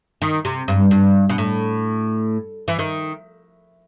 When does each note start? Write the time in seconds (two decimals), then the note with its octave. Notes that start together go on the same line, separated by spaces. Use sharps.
0.22 D#3
0.45 C3
0.68 G2
0.91 G2
1.29 B2
1.38 A2
2.68 E3
2.79 D#3